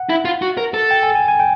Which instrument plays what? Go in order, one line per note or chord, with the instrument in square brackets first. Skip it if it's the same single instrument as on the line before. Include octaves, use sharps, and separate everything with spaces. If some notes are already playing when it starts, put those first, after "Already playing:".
Already playing: [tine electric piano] F#5
[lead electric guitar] E4
F4
F#4
A#4
A4
[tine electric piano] G5
G#5
G#5
G#5
G5